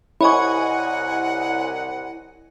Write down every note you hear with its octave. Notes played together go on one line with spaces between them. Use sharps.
C2 E4 C#5 D#5 F#5 G#5 B5 C#6